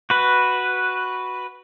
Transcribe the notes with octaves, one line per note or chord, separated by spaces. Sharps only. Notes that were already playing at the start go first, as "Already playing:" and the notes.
F#4 B4